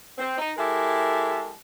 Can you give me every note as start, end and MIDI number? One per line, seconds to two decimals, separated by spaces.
0.18 0.35 60
0.38 0.52 63
0.57 1.51 56
0.57 1.51 64
0.57 1.51 67
0.57 1.51 69
0.57 1.51 70